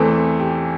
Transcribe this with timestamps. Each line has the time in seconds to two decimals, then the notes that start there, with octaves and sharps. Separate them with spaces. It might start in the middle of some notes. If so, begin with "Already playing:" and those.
Already playing: E2 E3 A3 C4 A4
0.40 G4